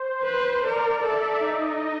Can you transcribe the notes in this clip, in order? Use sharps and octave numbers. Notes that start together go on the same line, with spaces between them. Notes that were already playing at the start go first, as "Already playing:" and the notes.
Already playing: C5
B4 C5
A#4 D5
A4 E5
D#4 D#5